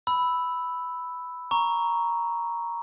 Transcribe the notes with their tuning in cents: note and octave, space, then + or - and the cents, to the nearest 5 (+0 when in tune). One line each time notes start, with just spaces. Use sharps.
B5 +5 E6 -5
A#5 +5 C#6 +0